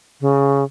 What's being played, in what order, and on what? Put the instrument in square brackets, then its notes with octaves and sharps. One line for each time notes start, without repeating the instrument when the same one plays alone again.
[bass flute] C#3